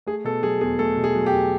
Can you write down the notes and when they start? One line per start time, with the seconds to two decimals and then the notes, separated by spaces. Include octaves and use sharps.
0.06 A3 G#4
0.24 B2 A4
0.43 F#3 G#4
0.61 E2 G#4
0.79 A3 A4
0.97 B2
1.04 G#4
1.15 F#3
1.26 G4
1.33 E2